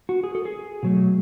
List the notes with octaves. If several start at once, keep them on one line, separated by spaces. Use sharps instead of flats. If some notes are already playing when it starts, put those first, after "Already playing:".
F#4
G#4
A4
G#4
B2 F#3 A3